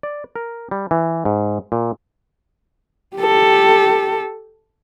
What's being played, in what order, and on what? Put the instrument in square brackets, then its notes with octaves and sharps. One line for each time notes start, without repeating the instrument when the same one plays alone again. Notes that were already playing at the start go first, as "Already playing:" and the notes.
[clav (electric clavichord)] D5
A#4
G3
E3
G#2
A#2
[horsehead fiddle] G4 A4